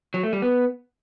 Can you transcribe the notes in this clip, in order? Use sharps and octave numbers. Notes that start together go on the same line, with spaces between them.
F#3
A3
G3
B3